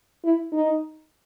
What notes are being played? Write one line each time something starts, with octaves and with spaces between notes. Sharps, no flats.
E4
D#4